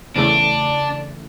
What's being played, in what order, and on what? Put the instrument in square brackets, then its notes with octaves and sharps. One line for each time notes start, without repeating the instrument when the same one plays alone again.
[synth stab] E2 C#3 E3 A3 [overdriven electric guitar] D4